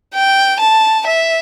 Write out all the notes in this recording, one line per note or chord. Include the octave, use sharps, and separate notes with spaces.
G5
A5
E5